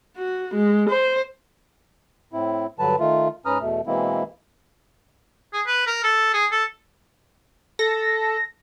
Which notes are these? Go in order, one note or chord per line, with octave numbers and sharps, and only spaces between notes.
F#4
G#3
C5
A2 C4 E4
G2 D3 F#3 B4 A5
D#3 A3 F4
G#2 C#4 B4 A#5 D#6 F6
E2 B2 A3
B2 E3 G#3 A#3 C4 E4
G#4
B4
A#4
A4
G#4
A4
A4 A#6